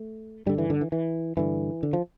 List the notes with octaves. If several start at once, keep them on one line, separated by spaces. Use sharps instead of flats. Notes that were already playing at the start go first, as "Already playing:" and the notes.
Already playing: A3
G2 D3 G3
E3
D3
E3
E3
G2 D3 E3
D3
F3